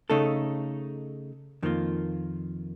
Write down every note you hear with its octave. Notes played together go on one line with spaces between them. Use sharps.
C#3 A3 D#4 A4
F2 D#3 A#3 F4